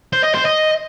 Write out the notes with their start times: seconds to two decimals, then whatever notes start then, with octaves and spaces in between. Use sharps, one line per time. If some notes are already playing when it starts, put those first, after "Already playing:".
0.13 C5
0.24 D#5
0.35 C5
0.45 D#5